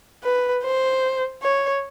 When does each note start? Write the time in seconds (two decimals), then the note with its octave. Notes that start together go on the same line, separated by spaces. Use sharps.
0.24 B4
0.63 C5
1.42 C#5